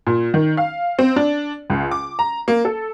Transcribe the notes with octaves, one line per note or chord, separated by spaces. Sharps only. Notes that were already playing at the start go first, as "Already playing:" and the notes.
A#2
D#3
F5
C4
D4
C#2
D6
A#5
A#3
A4